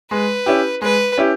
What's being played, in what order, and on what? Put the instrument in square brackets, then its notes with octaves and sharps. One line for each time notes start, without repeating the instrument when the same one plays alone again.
[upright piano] G#3 [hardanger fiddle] B4
[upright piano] C#4 E4 G4
[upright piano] G#3 [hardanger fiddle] B4
[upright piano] C#4 E4 G4